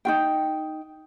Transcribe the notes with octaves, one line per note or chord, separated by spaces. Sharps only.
D#4 F4 G5